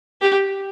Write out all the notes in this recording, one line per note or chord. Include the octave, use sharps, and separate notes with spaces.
G4